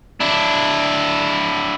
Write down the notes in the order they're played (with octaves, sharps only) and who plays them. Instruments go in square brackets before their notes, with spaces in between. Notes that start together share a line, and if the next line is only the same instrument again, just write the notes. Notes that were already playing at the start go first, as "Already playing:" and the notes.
[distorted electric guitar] D4 E4